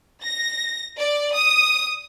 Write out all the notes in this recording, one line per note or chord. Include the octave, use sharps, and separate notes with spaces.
A#6
D5
D#6